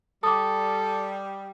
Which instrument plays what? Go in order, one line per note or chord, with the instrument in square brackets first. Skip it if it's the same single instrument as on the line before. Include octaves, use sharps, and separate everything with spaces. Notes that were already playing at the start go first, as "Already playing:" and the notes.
[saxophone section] G3 [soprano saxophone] A4 [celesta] D6 D#6